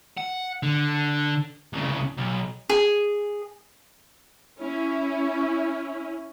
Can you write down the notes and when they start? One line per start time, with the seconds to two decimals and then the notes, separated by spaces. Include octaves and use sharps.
0.18 F#5
0.63 D3
1.73 C2 C#3
2.17 B1
2.70 G#4
4.60 C#4 E4